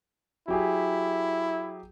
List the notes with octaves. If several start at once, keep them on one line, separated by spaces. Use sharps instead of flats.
F#3 E4 G4 G#4